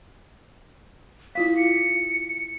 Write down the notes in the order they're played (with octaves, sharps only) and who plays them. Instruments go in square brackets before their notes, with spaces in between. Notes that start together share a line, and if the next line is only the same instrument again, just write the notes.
[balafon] E4 F4 F5 [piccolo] B6
[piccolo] C#7